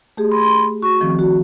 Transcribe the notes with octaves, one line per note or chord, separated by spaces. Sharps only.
A3 G4 G#4
B5 C6
F#4 C#6
D#3 F3 C4
F#4